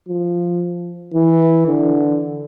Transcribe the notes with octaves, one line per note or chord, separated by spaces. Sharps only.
F3
E3
D3